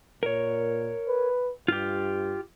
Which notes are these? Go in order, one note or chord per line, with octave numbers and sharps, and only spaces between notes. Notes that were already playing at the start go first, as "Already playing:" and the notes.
A#2 A#4 C#5
B4
G2 F4 G4